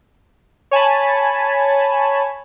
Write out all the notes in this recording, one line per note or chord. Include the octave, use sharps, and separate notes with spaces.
C#5 G#5 A5 B5